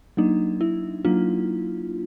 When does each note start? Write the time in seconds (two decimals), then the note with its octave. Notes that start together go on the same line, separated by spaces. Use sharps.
0.17 F#3 A#3 D4 D#4
0.61 E4
1.05 F#3 A#3 D4 F4